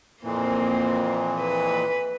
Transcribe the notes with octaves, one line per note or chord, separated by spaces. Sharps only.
F2 A#2 E3 A#3 C4
B4